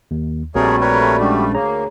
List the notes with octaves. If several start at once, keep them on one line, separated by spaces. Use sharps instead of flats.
D#2
A#1 G3 A3 C4 F#4 G#4 A#4 C#5
A#4 B4 C#5
G#3 C#4 D4 F#4 G4
D2 A#3 G#4 C#5 A#5